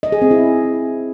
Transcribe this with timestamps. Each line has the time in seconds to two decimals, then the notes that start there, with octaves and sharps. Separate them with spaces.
0.03 D#5
0.12 G#4
0.22 C4
0.31 E4